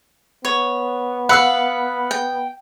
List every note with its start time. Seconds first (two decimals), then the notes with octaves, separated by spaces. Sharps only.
0.45 B3 C#5
1.29 B4 F5 F#5 E6 F#6
2.11 G5